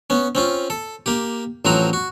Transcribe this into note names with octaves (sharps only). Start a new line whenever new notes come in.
B3 C#4
C4 C#4 F4
A4
A#3 G4
A1 F3 F#3 C4 F#4 A#5
F#4